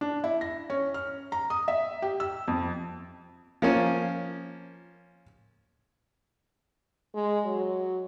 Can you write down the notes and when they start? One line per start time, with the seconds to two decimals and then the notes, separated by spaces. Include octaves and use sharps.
0.01 D4
0.24 E4
0.41 A#6
0.70 C#4
0.94 F6
1.32 A#5
1.50 D#6
1.68 E5
2.02 G4
2.20 E6
2.48 F2
3.62 F3 A#3 C#4
7.15 G#3
7.45 F#3